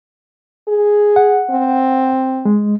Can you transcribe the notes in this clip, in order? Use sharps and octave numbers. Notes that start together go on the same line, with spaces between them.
G#4
F#5
C4
G#3